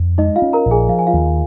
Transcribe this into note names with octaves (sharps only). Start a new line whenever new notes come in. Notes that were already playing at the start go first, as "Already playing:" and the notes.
Already playing: F2
G#3 D#4 D#5
F4 F5
C#4
A#4 A#5
A#1
G#4 G#5
F3 F5
G#5
F4 F5
D#2